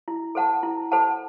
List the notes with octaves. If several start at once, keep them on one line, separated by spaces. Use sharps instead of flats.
E4
A4 C5 F#5 A5
E4
A4 C5 F#5 A5